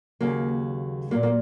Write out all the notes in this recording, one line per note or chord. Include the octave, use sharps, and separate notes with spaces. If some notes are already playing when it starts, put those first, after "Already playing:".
D#2 C#3 F#3 A#3
A#2 F#3 A#3
A#3